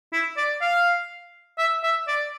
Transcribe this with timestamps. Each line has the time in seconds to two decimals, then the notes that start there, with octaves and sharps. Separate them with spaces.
0.13 E4
0.37 D5
0.61 F5
1.58 E5
1.83 E5
2.08 D5